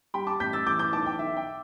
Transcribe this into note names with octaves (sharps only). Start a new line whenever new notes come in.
G3 G5 B5
A5 D6
A1 G6 B6
E6 A6
E3 D6 G6
D6 G6
B1 A5 D6
G5
B1 E5
G5